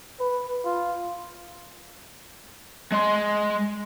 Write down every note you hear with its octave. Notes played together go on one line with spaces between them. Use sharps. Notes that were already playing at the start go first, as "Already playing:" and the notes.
B4
F4
G#3 C6